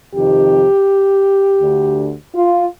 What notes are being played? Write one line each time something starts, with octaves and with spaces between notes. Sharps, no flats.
F2 C3 D#3 G4
D2 D3
F4